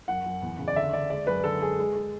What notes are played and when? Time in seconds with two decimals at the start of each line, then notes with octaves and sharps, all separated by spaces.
0.08 F#2 F#5
0.26 F#2
0.42 E2
0.59 C#3
0.68 D5
0.76 D3 E5
0.93 D3 D5
1.10 G#3 D5
1.27 F#2 B4
1.44 D3 A4
1.61 G#3 G#4
1.78 G#3
1.96 G#3